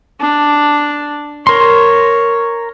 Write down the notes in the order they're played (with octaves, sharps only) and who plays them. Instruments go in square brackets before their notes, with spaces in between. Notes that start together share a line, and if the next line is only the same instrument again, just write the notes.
[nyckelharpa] D4
[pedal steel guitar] A#4 C6 [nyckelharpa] C#5